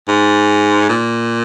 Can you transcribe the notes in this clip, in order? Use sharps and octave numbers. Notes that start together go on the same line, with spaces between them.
G#2
A#2